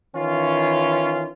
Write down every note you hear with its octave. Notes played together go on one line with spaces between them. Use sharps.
D#3 E3 C#4 F4